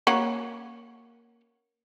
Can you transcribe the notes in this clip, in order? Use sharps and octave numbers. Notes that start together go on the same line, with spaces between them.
A#3 C#4 F#4